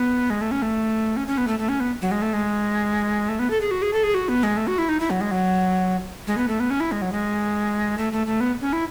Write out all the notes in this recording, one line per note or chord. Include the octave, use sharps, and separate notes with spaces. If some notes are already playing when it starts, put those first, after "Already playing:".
Already playing: B3
G#3
A3
C#4
A3
C#4
C#4
B3
A3
A3
C#4
B3
F#3
G#3
A3
G#3
A3
B3
A4
G#4
F#4
G#4
A4
G#4
F#4
B3
G#3
A3
F#4
E4
D#4
E4
F#3
G#3
F#3
G#3
B3
A3
B3
C#4
E4
G#3
F#3
G#3
A3
A3
A3
B3
C#4
E4